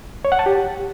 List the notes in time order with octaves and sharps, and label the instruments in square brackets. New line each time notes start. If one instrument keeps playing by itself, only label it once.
[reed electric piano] C#5
F#5
A5
G4